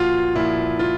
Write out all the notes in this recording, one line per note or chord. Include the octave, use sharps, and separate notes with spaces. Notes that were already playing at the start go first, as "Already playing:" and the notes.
Already playing: A#2 F3 F4 F#4
A#2 F3 E4
F4